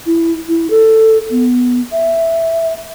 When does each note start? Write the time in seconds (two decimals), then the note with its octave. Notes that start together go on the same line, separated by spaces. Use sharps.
0.06 E4
0.48 E4
0.70 A4
1.31 B3
1.92 E5